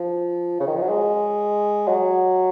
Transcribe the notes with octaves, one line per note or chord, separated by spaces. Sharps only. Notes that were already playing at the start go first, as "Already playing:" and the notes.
Already playing: F3
C#3
D#3
F3
F#3
G#3
F#3